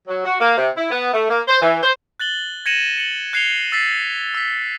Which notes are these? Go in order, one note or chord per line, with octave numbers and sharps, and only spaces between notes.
F#3
F#4
A#3
C3
E4
B3
A3
A#3
C5
E3
C5
F#6 A6 F#7 G7
G#6 A#6 C#7 D#7 E7 F#7
C#7 F#7
F#6 G#6 C7 C#7 F7 G7
E6 A6 B6 C7
E6 B6